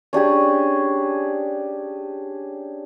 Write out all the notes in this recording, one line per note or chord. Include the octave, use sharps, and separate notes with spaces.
C#4 D4 G4 G#4